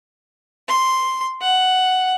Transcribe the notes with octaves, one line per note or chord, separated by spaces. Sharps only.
C6
F#5